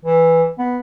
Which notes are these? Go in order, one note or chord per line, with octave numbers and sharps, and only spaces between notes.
E3
B3